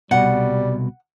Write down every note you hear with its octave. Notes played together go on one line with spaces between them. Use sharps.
C2 F2 B2 G3 F#5